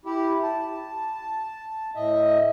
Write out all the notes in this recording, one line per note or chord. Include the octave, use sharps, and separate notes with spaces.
E4 G4
A5
A2 D#5 E5